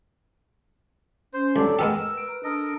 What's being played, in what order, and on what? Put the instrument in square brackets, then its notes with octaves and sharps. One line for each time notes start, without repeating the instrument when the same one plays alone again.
[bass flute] C#4 [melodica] C5
[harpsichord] C2 [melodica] F#3 D4 D5 [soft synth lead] A4
[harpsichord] G#3 B3 G4 [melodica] A#4 [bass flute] B4 [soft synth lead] E6
[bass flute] B4 [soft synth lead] D7
[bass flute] D4 [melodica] A4 A#4 D#5